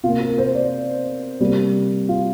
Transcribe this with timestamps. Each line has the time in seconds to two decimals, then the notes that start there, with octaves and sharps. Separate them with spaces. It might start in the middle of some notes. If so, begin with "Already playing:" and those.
0.04 C3 F4
0.06 A#3
0.21 A#4
0.38 C5
0.55 D5
1.40 C3 G3 A#3
2.09 F4